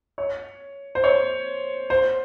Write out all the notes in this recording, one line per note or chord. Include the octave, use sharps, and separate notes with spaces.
C#5
C5
C#5
C5